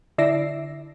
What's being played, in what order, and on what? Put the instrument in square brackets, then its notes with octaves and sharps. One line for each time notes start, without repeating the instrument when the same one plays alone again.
[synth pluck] D3 E4 D5 E5 A#6 C7